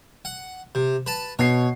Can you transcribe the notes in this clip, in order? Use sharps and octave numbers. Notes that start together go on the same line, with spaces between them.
F#5
C3
B4 A5
B2 C#5 C7